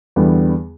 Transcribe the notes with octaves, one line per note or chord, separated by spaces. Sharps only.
E2 D3 G3 B3